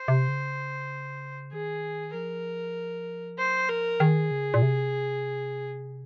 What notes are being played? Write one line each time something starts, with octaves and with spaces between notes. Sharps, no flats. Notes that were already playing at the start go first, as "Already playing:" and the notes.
Already playing: C5
C3
C#3
D#3 G#4
F3 A#4
F#3 C5
F3 A#4
D#3 G#4
C#3
A#2
C3